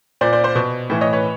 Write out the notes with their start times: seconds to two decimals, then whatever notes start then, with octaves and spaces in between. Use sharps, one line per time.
0.21 A#2 C5 D5
0.32 C5 D5
0.44 C5 D5
0.55 B2
0.90 A2 E3
1.01 C#5 D#5
1.13 B4 C#5